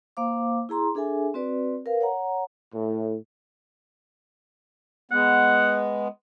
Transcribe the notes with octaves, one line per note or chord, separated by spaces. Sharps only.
A#3 C5 F5 D6
E4 G#4 A#5 C6
D4 G#4 A4 E5 G#5
C4 F#4 B4 D5
A#4 B4 F5
C#5 F#5 A#5
A2
G#3 B3 F#5